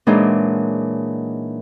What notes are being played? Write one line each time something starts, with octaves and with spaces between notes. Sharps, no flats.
A#2 E3 F#3 G#3 D4 D#4